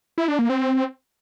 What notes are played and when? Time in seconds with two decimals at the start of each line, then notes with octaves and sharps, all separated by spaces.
0.18 E4
0.28 D4
0.39 A#3
0.50 C4